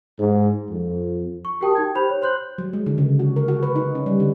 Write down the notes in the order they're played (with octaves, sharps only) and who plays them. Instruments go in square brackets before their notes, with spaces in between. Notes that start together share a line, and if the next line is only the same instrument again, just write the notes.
[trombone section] G#2
F2
[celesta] C#6
F#4 G4 A#4 G5 A5 D#6
D#4 G5 G#6
G4 C5 B5 G6 F7
C#5
C5 C6 F#6 G6 F#7
[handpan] F#3
G#3
D3
C#3
F#4
A#4
F#4
B4
D#4
C#4
G3
D3